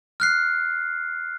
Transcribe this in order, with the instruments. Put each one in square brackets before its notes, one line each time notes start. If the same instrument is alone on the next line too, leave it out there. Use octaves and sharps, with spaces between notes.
[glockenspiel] F6 F#6 C7